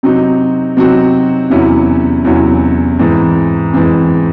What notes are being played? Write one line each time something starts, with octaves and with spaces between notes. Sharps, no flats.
C3 F#3 C4 D#4 F#4
C3 F#3 C4 D#4 F#4
E2 C3 F#3 C#4 E4
E2 C3 F#3 C#4 E4
G#2 E3 C4
G#2 E3 C4